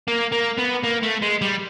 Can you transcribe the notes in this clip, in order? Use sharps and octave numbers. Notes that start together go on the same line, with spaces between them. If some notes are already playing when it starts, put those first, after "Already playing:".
A#3
A#3
B3
A#3
A3
G#3
G3